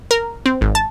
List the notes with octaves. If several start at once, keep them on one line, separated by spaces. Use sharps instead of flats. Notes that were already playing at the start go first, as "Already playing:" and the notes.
A#4
C4
G#1
A5